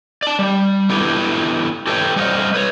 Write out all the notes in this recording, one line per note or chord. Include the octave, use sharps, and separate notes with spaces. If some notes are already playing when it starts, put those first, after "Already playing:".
D5 A5
G3
B3 D4 E4 G4 A4
G4 A4 B4 C#5 F#5 G5
G3 C5 D#5 F5 F#5
B4 C#5